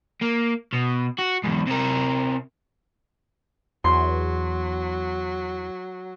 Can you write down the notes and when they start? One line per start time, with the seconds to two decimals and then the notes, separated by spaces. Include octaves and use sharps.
0.21 A#3
0.73 B2
1.18 F#4
1.44 E2 G#2
1.67 C3 A#4
3.84 E2 F#3 C6